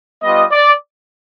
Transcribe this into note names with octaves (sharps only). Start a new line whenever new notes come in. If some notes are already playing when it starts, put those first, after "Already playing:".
G3 B3 F4 D#5
D5